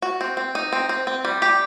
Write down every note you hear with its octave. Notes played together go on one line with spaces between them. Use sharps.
F#4
C4
C4
D#4
C4
C4
C4
G3
G4